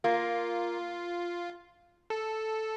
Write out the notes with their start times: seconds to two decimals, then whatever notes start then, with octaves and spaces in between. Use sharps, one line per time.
0.04 A#3 F4
2.10 A4